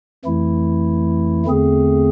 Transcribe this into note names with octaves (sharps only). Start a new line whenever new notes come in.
F2 E3 A3 E4
E2 D3 A3 C4 G#4